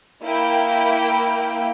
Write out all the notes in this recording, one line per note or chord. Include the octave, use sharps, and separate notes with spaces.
A#3 E4 G5